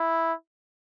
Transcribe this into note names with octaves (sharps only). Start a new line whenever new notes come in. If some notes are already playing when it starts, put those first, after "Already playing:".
Already playing: E4